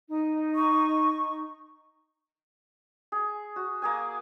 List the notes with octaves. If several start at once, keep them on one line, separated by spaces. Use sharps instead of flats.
D#4
C#6
G#4
F#4
A#3 G#4 G#5